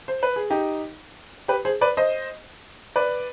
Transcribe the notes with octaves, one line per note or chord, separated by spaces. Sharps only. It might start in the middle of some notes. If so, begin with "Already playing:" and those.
C5
B4
G#4
D#4 G4
G4 B4
G#4 C5
B4 D5
C5 D#5
B4 D5